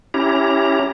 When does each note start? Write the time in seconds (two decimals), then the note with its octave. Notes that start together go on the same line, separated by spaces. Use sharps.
0.14 C#4 E4 G4 A#5